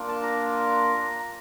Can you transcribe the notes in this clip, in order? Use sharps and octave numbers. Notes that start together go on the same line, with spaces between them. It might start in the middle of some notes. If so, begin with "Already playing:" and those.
Already playing: A#3 D4 F4
A5
A#5